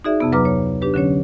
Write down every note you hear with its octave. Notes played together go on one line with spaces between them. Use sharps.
D#4 F#4 G#4 D5 E5
F2 C3 B3
D2 F#3 B4 A#5 D6 F6
C#5
D4 G4 B4
D3 F#3 C#4 C#5